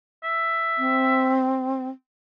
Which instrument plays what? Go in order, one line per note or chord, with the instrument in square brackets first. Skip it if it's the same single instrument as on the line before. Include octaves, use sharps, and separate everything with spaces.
[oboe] E5
[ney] C4